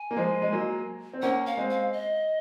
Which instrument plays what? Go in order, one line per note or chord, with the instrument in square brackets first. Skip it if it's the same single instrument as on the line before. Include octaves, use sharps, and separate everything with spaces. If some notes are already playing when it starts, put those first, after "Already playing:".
Already playing: [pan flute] G#5
[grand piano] A#3
F3 G#3
G#3
F#3 A#3
C4
[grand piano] A#3 C#4 [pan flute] F#5
[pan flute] F5
[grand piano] G#3 C4
[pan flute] F5
D#5